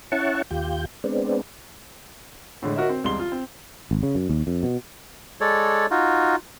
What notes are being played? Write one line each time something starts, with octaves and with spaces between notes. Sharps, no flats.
C#4 E4 F#5 A5 C#6
D#2 F4 G4 G6
G#3 B3 C4 D4
A2 D3 G#3
D#4 F#4 A#4 D#5 E5
C4
E1 C2 G#3 C6 G7
F4
C4
G#1
C#3
F#2
D#2
F2
B2
G#3 A4 C#5 D5
D#4 F4 F#4